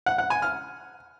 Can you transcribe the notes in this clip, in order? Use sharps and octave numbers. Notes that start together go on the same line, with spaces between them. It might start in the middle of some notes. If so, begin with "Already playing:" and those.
F#5
F#5
G#5
F6